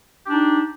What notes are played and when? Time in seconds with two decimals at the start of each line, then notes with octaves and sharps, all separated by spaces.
0.25 G4
0.28 D4
0.31 D#4